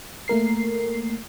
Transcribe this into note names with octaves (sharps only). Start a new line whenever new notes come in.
A3 A#3 A#4 C7